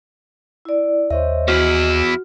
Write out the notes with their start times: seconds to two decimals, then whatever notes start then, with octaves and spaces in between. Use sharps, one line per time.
0.65 E4 D5
1.11 D#2 C5 C#5 D#5 E5
1.48 E2 E4 F#4 F6